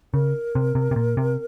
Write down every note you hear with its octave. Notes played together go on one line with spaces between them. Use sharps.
C#3 A#4
C3
C3
C3
A#2
C3